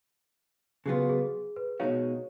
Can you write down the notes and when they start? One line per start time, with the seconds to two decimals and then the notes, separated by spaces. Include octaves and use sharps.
0.86 C#3 F#3 B3 F4 G#4
1.09 G#4
1.56 B4
1.80 B2 G#3 D#4 F#4 C#5 F5